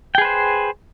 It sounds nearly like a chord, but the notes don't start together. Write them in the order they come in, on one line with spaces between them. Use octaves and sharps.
G5 G#4 B4 C5